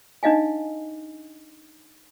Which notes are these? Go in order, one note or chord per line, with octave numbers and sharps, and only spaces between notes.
D4 D#4 D#5 F5 G#5